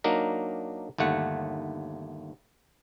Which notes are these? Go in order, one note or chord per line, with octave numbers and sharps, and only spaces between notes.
F#3 A#3 D4 D#4 A#4
G1 D#2 A3 F#5